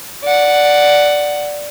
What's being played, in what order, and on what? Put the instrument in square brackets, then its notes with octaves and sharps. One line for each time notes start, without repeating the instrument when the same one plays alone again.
[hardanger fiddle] D5 F#5